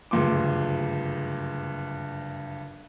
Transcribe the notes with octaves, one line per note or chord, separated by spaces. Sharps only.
F#1 D2 G2 F3 C6 D6